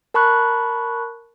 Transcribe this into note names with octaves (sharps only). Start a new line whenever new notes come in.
A#4 A5 B5 C#6 F#6